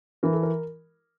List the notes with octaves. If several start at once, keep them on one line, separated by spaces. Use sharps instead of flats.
E3 A#4
A4
A#4